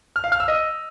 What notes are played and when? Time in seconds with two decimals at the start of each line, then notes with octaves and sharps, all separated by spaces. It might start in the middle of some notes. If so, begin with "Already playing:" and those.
0.16 F6
0.24 F5
0.32 F6
0.40 E6
0.48 D#5